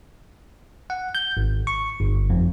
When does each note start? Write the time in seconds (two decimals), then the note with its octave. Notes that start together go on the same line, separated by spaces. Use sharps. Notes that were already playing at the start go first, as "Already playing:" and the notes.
0.90 F#5
1.15 G6
1.37 G#1
1.67 C#6
2.00 G1
2.30 F2